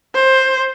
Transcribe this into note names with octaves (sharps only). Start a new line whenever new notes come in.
C5